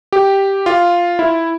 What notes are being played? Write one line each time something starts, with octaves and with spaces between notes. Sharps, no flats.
G4
F4
E4